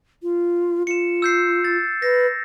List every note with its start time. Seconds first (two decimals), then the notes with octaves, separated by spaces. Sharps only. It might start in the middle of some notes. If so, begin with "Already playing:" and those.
0.23 F4
0.87 F4 C#7 E7
1.22 E6 G6 C7
1.64 A6
2.02 B4 A#6